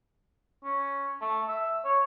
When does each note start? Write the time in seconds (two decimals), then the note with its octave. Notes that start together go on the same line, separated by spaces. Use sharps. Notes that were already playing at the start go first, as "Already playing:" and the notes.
0.64 C#4
1.21 A3
1.48 E5
1.85 C#5